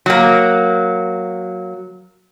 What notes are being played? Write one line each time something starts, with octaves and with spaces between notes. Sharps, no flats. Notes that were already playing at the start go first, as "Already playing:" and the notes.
F#3 A#3